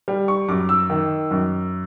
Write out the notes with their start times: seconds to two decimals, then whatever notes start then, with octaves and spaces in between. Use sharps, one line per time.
0.08 G3
0.28 C#6
0.48 F#2 D6
0.69 E6
0.90 D#3
1.31 F#2